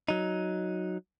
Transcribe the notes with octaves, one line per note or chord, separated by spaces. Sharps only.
F#3 D#4